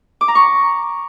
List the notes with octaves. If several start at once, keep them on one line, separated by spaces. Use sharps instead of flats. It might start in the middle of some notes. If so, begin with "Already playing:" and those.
D6
A#5
C#6